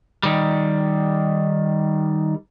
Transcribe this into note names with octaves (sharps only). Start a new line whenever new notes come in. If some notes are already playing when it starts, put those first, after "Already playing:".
D#3 G3